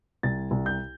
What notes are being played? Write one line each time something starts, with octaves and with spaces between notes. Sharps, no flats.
C2 A6
C2
G6